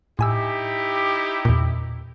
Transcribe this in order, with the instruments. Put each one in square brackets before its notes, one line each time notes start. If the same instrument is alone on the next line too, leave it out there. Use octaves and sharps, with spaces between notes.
[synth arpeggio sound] A2 G#5 E6 [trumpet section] D#4 E4 G4
[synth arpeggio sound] E2 A#2